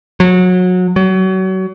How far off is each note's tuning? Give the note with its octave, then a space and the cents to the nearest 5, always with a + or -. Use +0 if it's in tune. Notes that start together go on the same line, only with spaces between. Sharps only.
F#3 -25
F#3 +30